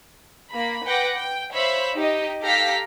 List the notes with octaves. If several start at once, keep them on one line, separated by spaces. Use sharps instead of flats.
A#3 B5
B4 F#5 G5 D6 A#6
G5
C5 C#5 E5 F5 B5
D#4 G4 D#5
G4 A4 F5 A#5 F6 B6